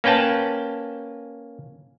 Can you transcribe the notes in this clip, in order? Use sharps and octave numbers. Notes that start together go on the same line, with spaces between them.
A#3 C#4 B4 G5 A5